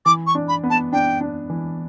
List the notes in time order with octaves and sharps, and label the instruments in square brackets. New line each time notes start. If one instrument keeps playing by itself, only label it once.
[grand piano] E3 [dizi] D6
[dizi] C#6
[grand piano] D4
[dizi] B5
[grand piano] B3
[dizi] A5
[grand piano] D4 [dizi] G5
[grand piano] D4
E3